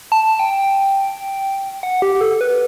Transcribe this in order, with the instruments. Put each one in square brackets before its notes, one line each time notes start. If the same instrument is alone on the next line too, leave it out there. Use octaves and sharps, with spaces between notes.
[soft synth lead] A5
A5
G5
F#5
G4
A4
B4